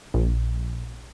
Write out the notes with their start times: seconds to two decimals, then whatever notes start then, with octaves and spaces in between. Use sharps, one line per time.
0.14 A#1